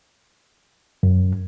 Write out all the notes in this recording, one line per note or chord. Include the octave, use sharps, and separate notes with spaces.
F#2